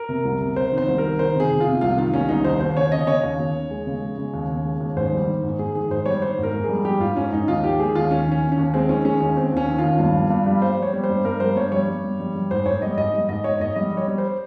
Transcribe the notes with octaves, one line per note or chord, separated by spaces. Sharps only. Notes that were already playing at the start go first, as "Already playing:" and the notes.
Already playing: A#4
C3
C2
C3
C3 C5
D#3
C5
C2
A#4
D#3
D#3 C5
C3
G#4
C3
F4
C3
C2 F4
D#3 F4
C2 C#4
C2 D#4
D#2 C5
D#2 C5
C#3 C#5
C#3 D#5
C#3 C#5
D#2
D#2
D#2
G#3
C#3
G#3
C#3
D#2
C#3
G#3
D#2
G#2 C5
G3
D#3
G#2
G#2 G#4
D#3 G#4
G#2 C5
G3 C#5
D#3 C5
G#2
A#4
G#2
G3 G#4
G3 G4
G#2 F4
G#2 C#4
G#2 D#4
D#2 F4
D#3 G4
G#3 G#4
D#2 F4
D#2 C#4
D#3
C#4
D#3
C#4
D#2
G#3 C4
D#3 C#4
G#3 C#4
D#2 C#4
D#2 C4
D#2 C#4
D#3
F4
D#2
G2
G3
G2
G3
G3 C5
G3 C#5
G3
C5
G2
G2 A#4
G3 C5
G2 C#5
G3 C#5
G3
G2
G3
G3
G#2 C5
G#2 C#5
G3 D#5
G#2 D#5
G3
G#2 D#5
G#2 C#5
G#2 D#5
G3 D#5
G3 C#5
G3
C5